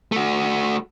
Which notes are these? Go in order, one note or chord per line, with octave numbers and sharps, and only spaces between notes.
A3 F#4